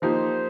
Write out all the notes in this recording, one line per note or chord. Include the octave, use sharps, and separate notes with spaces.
F3 A#3 D#4 G4 C5